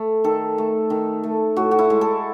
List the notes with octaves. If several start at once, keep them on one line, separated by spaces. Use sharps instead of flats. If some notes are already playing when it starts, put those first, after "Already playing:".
Already playing: A3
D#3 A4
A3
D#3
A3
A2 F#4
F#4
E4
G#3
A4